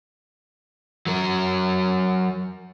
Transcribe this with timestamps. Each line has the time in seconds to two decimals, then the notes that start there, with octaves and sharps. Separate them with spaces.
1.07 F#3 A#4